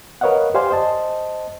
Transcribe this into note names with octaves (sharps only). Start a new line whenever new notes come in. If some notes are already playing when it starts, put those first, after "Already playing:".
A#4 B4 C#5 D#5 F5 F#5
G4 C5 D5 F5 G#5 C6
C5 D#5 A5